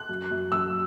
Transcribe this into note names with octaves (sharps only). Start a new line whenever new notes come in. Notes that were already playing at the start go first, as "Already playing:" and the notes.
Already playing: F#6
F#2
F#2
F#2 E6